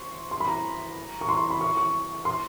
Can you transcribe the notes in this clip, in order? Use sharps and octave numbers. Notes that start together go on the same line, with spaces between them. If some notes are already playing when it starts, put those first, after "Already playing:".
Already playing: C6 C#6
C6
B5
A#5
C#6
C6
C6
B5
C#6
C#6
C6